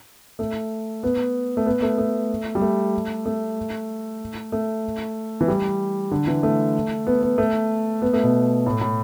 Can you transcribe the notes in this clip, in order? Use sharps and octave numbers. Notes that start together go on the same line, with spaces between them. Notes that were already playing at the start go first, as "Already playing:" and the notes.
A3
B3
A3
B3
A3
A3
G3
A3
A3
A3
E3
G3
D3
E3
A3
B3
B3
A3
B3
A3
B2
A2
A2